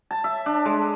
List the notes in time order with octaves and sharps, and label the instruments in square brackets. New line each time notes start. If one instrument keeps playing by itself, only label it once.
[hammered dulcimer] A5
E5
D4
G#3